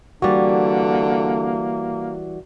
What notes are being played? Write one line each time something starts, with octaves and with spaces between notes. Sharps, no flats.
D3 E3 G3 A#3 F#4 D5